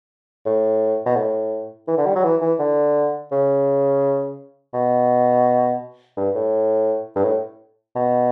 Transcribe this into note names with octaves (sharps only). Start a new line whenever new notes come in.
A2
B2
A2
E3
D3
G3
F#3
E3
E3
D3
C#3
B2
G2
A2
G2
A2
B2